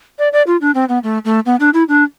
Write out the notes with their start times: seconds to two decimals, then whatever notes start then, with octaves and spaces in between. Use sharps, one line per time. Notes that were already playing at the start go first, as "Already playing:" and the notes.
0.19 D5
0.33 D5
0.47 F4
0.61 D4
0.75 C4
0.89 B3
1.04 A3
1.25 A3
1.46 B3
1.60 D4
1.74 E4
1.89 D4